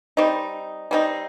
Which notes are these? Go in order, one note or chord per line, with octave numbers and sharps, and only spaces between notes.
G3 C4 D#4
G3 C4 D#4